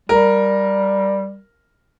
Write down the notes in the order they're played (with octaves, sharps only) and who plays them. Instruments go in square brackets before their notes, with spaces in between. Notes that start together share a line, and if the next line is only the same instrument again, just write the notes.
[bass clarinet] G3 [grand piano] A#4